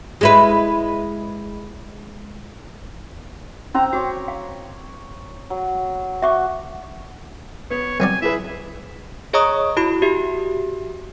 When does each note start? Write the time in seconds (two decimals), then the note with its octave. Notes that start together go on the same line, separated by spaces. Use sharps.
0.21 G#3 E4 B4
3.74 C4 C#4 C5 A#5
3.93 F#4 C#5 C#6 D6
4.28 F5
5.50 F#3
6.22 F#4 E5 C#6 D6
7.71 B3 C#5
8.00 C2 F#3 D5 G#5
8.22 E4 G#4 B4 E5
9.33 G#4 C#5 D#5 A#5 C#6 D#6
9.77 E4 F#4 B5
10.02 F#4 G4 E5